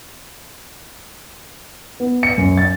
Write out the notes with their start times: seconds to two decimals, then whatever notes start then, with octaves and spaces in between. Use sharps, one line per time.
2.00 B3
2.23 C#7
2.38 F#2
2.57 A6